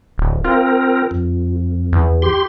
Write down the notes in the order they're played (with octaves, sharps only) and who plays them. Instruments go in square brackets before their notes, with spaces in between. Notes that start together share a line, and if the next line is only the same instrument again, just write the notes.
[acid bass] D1
[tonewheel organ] C4 A#4 [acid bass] F4
[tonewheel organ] F2
[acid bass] E2
[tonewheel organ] G4 C6